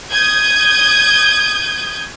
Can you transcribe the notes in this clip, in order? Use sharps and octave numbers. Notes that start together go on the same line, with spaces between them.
D#6 G6 G#6